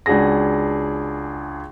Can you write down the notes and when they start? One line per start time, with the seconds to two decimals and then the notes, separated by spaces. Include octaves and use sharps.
0.06 C#2 D4 F#4 G#4 A#6